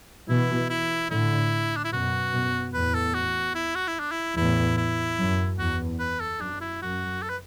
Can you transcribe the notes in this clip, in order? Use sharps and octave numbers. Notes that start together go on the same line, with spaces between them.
B2 E3 E4
E4
A2 D3 E4
D4
E4
F#2 B2 F#4
F#2 B2
E2 A2 B4
A4
F#4
E4
F#4
E4
D4
E4
E2 A2 E4
E4
F#2
E2 F#4
B4
A4
F#2 D4
E4
F#2 F#4
A4
B4